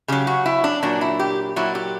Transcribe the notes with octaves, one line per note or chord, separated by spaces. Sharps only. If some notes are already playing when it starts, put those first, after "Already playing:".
C#3 F#3 G4
F#4
E4
D4
A#2 F#3 D4
E4
G4
A#2 F#3 E4
G4